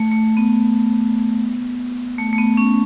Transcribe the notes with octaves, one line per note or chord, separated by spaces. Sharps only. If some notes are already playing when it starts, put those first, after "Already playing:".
Already playing: A3
A3
B3
A3
A3
B3
C#4